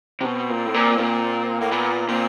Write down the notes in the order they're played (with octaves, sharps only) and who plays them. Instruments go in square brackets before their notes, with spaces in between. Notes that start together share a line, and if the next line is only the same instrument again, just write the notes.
[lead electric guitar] C3
[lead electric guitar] B2 [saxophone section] C4
[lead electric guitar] A#2
A2
A#2
A#2
[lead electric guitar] A2 [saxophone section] A#3
[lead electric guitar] A#2 [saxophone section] B3
[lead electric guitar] A#2 [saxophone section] C4